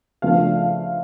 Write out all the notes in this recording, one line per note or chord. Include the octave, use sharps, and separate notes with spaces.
C#3 F3 A3 D4 F5
F5